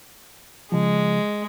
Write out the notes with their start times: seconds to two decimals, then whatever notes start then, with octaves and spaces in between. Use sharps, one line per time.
0.72 C#3 F3 G#3